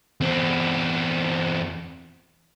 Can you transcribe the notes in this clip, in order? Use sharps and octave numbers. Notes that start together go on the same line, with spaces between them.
E2 C4